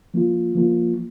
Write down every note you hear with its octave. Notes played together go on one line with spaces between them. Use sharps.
F3 A#3 F4
F3 A#3 F4